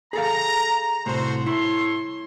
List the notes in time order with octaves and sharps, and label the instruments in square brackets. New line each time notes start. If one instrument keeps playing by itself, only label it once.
[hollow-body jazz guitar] G#4 A4 F5 [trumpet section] A#5
[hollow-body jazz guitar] C2 A2 [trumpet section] F#4 A4 C5
[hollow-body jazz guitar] E4 [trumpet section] A4 C#5 C6